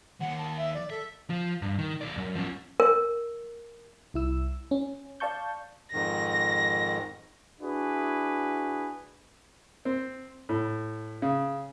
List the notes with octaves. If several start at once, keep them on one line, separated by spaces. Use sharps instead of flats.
D#2 F#5
A5
E5
D5
A4 E5
F3
G2
D#3
B1 D5
F#2
F3 C#4
A#4
C2 E4 E6
C#4
D5 F5 A5 C#6 G6
F2 G#2 D#3 A#6
D4 E4 F#4 G#4 B4
C4
A2
C#3